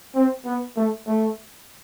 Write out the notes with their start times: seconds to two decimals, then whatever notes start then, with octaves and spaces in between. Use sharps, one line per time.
0.15 C4
0.45 B3
0.76 A3
1.07 A3